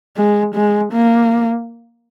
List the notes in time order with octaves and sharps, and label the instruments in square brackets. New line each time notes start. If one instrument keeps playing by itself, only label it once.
[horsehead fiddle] G#3
G#3
A#3